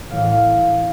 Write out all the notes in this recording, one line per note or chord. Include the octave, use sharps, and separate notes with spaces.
A2 E3 F5
F5